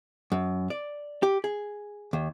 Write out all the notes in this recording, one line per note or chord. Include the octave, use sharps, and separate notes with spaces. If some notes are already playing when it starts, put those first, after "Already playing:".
F#2
D5
G4
G#4
D#2